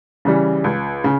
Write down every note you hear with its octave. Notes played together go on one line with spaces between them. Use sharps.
C#3 E3 G3
C#2
C#3